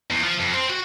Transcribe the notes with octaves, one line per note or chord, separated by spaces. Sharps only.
E2
F3
F2
C4
F#4